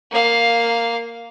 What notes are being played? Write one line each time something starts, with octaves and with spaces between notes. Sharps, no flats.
A#3 F5